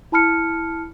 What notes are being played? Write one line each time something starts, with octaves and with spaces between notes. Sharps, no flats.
E4 A5 B5 F6 C#7